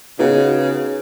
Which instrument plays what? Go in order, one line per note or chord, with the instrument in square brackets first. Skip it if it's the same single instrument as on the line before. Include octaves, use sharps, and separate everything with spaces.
[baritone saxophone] C#3 [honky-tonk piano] B3 D#4 F#4